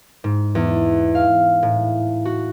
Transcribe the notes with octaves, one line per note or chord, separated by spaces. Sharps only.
G#2
E2
F5
A2
F#4